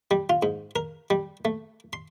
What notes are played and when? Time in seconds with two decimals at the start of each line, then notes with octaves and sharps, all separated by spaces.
0.11 G3
0.30 F4
0.43 G#2
0.76 A#4
1.10 G3
1.45 A3
1.93 C6